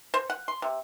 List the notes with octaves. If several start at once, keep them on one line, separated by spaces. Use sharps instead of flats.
C5
F#5
C6
C3